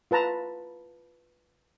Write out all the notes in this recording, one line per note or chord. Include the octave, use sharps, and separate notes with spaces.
F4 B4 A5 A#5